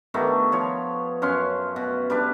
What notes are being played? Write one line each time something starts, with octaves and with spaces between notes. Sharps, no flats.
D#3 G3 A3 B3
F3 C#5
F#2 C#4 F5 C6
B2
G3 D4 B4